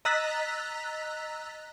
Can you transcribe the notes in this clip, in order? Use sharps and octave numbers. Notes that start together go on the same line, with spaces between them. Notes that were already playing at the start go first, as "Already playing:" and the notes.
D#5 A#5 E6 F#6 A6 B6